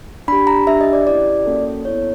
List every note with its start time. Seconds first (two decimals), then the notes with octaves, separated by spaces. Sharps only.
0.28 D4 G4 B5
0.47 A#5
0.67 D4 G4 E5
0.81 D#5
0.93 D5
1.06 C#4 E4 G4 D5
1.46 A#3 C#4 F#4 A4
1.85 B3 E4 A4 C#5